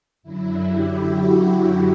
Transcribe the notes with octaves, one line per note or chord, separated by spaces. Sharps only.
F#2 D3 F#3 E4
G4
F#4
G4